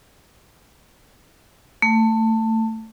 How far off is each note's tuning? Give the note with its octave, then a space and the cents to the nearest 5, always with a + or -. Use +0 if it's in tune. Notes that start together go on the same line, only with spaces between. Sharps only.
A3 +20